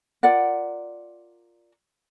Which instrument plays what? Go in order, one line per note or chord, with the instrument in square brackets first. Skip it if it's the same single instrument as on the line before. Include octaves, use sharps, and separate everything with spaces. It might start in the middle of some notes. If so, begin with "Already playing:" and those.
[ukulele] F4 A#4 D5 F#5